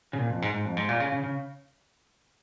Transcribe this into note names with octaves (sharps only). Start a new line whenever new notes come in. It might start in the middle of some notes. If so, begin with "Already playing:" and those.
C#3
A#2
F2
G#2
G#2
F2
G#2
A#2
C#3
C#3
C#3